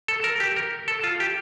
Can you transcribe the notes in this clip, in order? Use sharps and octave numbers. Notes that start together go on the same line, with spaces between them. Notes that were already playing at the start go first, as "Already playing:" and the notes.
A4
A#4
G4
A#4
A4
F4
G4